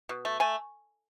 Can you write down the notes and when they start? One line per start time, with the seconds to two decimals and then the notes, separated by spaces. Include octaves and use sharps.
0.09 B2
0.25 A3
0.40 A3 G#5